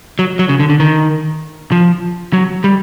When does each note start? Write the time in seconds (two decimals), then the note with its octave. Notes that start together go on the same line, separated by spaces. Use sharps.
0.19 F#3
0.39 F#3
0.49 C#3
0.59 D3
0.70 D3
0.80 D#3
1.72 F3
2.33 F#3
2.64 G3